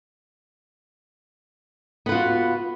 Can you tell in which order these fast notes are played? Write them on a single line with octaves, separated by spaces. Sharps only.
B3 B4 F4 F#4